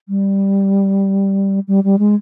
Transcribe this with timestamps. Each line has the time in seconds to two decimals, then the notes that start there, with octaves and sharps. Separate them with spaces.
0.09 G3
1.68 G3
1.84 G3
1.99 G#3